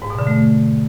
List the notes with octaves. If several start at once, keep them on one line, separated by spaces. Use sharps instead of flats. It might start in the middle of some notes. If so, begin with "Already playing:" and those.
G#2
B2
D3
A3